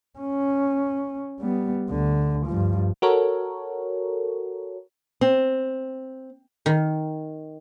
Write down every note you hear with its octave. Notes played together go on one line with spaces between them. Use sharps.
C#4
G3 B3
D2 D3
G2 F3
F#4 A4 A#4 C#5
C4
D#3